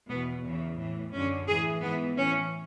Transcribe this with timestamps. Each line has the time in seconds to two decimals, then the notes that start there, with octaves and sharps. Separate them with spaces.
0.09 E2 B2 B3
0.44 E2 C#3 E3
0.78 A2 E3
1.13 F#2 D3 C#4
1.47 A2 E3 G#4
1.82 G#2 E3 B3
2.17 A2 E3 C#4